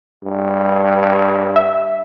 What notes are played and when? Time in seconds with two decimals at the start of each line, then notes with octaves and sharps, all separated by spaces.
0.24 G2
1.56 E5